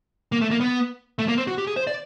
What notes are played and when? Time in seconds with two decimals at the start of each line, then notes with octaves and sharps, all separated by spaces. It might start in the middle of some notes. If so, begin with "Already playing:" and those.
0.32 A#3
0.41 A3
0.51 A#3
0.60 B3
1.19 A3
1.28 A#3
1.38 C4
1.47 F#4
1.58 G4
1.67 G#4
1.76 C5
1.87 D5